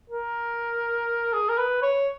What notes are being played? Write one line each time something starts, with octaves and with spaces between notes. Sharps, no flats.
A#4
G#4
A#4
B4
C#5